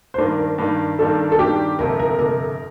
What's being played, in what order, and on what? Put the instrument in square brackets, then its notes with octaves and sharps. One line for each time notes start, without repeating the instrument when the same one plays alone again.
[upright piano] C5
[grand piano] G2 D#3 A#3 D4 [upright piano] A#4
[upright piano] A#4
[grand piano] G2 D#3 A#3 D4
[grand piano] G2 D#3 A#3 D4 [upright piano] A4
[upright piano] A4
[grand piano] G2 D#3 A#3 D4 [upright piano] G4
[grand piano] G1 F2 C3 [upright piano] A#4
[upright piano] A#4
[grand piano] G1 F2 C3 [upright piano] A#4